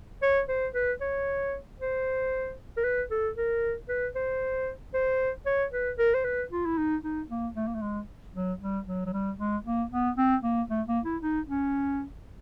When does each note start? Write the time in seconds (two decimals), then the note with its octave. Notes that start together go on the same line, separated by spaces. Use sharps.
0.23 C#5
0.49 C5
0.74 B4
1.01 C#5
1.80 C5
2.77 A#4
2.84 B4
3.11 A4
3.37 A#4
3.89 B4
4.16 C5
4.94 C5
5.46 C#5
5.73 B4
5.99 A#4
6.14 C5
6.25 B4
6.51 F4
6.66 E4
6.78 D#4
7.03 D#4
7.30 A#3
7.56 A3
7.67 A#3
7.75 A3
7.82 G#3
8.35 F#3
8.61 G3
8.87 F#3
9.06 F#3
9.13 G3
9.39 G#3
9.65 A#3
9.92 B3
10.18 C4
10.44 A#3
10.70 A3
10.87 A#3
11.05 E4
11.22 D#4
11.49 C#4